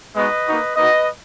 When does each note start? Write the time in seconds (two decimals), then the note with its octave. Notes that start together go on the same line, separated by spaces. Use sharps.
0.15 G#3 B3 D#4 F#4 B4 D#5
0.46 A#3 D#4 F#4
0.76 A#3 D#4 F#4 B4 D#5